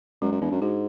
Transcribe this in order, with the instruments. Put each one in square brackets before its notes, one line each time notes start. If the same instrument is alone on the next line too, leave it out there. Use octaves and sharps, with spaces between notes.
[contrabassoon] F#2 [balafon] G#3
[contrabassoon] F#2
[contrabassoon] E2 [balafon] D4
[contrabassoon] F#2
[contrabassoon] G#2 [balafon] F#4